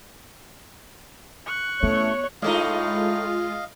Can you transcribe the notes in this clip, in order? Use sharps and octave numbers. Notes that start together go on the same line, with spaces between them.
C#6 F#6
A1 A3 B3 C#5
A2 G#3 A3 D#4 F4 D#5 F5